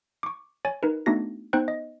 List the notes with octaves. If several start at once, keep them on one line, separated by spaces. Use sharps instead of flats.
C#6 D6
C#5 G#5 A6
D#4 A#4 B4
A3 B3 D4 D#4 F#4 A#6
B3 D#4 C5 G5 F#6
D#5